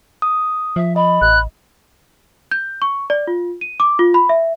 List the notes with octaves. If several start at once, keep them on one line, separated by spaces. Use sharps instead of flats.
D#6
F3 E5
D#5 B5
A1 F#6
G6
C#6
D5
F4
D#7
D6
F4
B5
E5